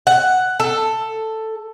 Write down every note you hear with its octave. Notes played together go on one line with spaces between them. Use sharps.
F#5
A4